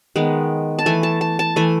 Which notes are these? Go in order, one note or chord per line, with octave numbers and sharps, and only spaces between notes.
D#3 G#3 B3
A5
E3 A3 G#5
A5
A5
A5
E3 A3 G#5